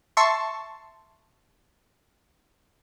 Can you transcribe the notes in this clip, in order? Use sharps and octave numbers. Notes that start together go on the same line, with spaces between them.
E5 A5 C6 C#6